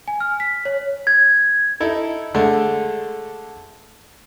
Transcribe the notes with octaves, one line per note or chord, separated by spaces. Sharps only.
G#5
F6
B6
C#5
G#6
D#4 E4 A4
D3 G#3 A3